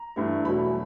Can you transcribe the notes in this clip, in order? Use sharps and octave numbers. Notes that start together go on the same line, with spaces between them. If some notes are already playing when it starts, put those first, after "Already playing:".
Already playing: A#5
G2 E3 A3
E2 B2 F#3 A3 B5